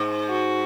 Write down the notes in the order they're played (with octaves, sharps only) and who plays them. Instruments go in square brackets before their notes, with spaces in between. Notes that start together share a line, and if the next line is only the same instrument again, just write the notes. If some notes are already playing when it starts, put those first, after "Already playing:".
Already playing: [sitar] G#2
[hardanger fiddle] F#4